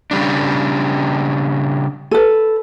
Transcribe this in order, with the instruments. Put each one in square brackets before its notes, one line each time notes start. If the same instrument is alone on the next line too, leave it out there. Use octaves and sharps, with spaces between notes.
[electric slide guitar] C#3 G3 D4
[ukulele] A4 B4